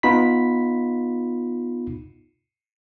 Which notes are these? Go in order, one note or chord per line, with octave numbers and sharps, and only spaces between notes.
B3 D#4 F4 B5 B6